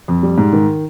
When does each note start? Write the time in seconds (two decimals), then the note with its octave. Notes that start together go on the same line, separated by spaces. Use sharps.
0.08 F2
0.23 G3
0.38 G#2
0.53 D#3